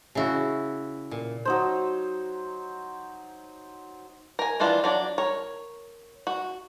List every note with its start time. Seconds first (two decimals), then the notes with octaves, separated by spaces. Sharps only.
0.15 C#3 E4 F#4
1.11 A#2
1.45 F#3 D#4 C5
4.39 A#4 G#5
4.60 D#3 E3 D4 E4 F4
4.84 F#3 D4 D5
5.18 A#4 C#5
6.27 F#4